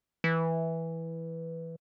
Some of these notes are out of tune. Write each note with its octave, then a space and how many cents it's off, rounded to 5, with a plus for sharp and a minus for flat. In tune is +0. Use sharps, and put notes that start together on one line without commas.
E3 -5